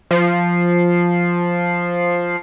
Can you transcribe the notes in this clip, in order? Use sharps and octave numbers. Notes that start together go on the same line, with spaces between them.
F3 C7